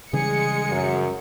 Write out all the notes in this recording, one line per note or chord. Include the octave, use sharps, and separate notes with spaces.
C#3 E3 G3 G#3 G#4 C#7
F#2